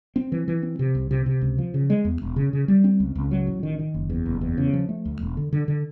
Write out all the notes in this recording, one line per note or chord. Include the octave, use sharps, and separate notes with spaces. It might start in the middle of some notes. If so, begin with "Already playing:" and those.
C4
E3
E3
C4
C3
C2
C3
C3
C#2
F3
C#3
G#3
E2
E1
C#3
C#3
G3
C4
C#2
C#2
F#3
A1
D#3
D#3
F#1
E2
F#1
E2
C#3
F3
A3
D2
E1
D3
D3
D3